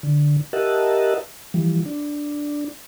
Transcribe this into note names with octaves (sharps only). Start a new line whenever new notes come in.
D3
G4 A#4 D#5 E5 F#5 A5
E3 F3 G3
D4